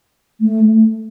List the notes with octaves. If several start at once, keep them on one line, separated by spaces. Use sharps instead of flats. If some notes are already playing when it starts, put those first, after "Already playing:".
A3